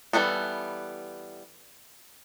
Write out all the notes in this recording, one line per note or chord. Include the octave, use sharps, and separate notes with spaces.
E3 G3 G#3 B3 A4